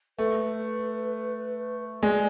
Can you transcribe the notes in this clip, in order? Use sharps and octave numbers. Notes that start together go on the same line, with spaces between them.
A3 B4
G#3 D5